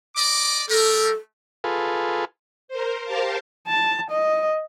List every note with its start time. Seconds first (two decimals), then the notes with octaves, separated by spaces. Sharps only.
0.16 D5 D#5 D6
0.69 G3 A4 A#4
1.64 F4 G#4 A4 B4
2.68 A#4 C5
3.04 G4 A#4 C5 F5 A5
3.67 A5
4.10 D#5